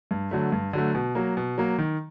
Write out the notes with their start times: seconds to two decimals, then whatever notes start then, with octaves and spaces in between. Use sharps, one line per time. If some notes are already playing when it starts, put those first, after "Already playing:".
0.11 G2
0.31 D3 F#3 A3
0.52 G2
0.73 D3 F#3 A3
0.95 B2
1.15 F#3 A#3
1.37 B2
1.58 F#3 A#3
1.78 D#3